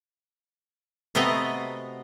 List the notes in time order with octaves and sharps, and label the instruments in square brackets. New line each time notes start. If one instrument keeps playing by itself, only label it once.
[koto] C3 A3 B3 F#4 D#5 A#5